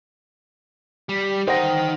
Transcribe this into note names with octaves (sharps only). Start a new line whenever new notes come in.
G3
D#4 C5 F#5 G5 A#6